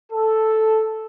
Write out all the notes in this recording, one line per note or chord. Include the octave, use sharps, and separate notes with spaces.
A4